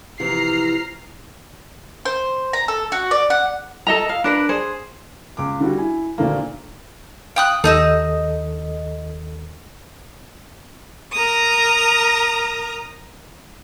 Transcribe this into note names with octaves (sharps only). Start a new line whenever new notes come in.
C3 E3 F3 A#5 F6 C7
C5
A#5
A4
F#4
D5
F#5
A4 D#5 A#5
F5
D4 A#4 B4
G#4 C5
C#2 D6
D3 G3 F#4
E4 G#5
D2 A#2 D3 D#3 A3 A#3
F5 G5 D#6 F#6
D#2 D#3 D#4 A4 D#5 E6
A#4 A#5 D#6